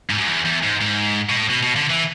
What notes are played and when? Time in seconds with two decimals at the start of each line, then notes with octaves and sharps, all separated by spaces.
0.10 G#2
0.18 F#2
0.28 E2
0.45 E2
0.63 G#2
0.81 G#2
1.30 B2
1.36 A2
1.50 B2
1.63 B2
1.76 D3
1.90 E3